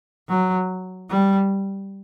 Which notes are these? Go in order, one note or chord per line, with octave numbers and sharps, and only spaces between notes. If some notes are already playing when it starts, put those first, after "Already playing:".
F#3
G3